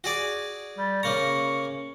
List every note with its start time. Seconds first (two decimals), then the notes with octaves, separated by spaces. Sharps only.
0.04 F#4 G#4 D5
0.78 G3
1.03 C#3 A#3 A#5 C#6